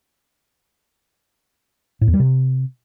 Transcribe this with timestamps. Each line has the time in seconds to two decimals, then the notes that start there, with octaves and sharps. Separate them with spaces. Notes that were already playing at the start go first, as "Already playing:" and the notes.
2.01 A2
2.07 E2
2.14 G3
2.20 C3